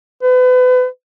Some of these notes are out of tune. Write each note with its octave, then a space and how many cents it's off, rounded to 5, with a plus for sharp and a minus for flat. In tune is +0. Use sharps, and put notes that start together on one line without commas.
B4 +35